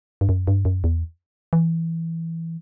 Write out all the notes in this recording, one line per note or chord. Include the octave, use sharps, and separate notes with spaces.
G2
F#2
G2
F#2
E2
E3